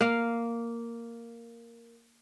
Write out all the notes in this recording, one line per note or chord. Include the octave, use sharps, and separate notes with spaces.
A#3 F5